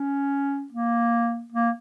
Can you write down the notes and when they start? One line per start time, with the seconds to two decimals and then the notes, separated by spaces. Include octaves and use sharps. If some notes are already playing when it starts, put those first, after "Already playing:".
Already playing: C#4
0.72 A#3
1.52 A#3